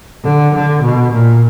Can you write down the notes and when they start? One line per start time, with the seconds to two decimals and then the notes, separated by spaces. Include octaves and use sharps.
0.25 D3
0.54 D3
0.82 B2
1.12 A#2